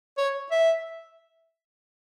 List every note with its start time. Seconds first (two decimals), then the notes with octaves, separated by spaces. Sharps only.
0.18 C#5
0.51 E5